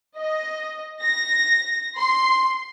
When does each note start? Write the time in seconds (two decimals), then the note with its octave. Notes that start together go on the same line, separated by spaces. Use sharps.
0.17 D#5
1.02 A#6
1.97 C6